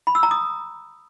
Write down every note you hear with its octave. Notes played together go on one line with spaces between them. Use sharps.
B5
E6
A#5
D#6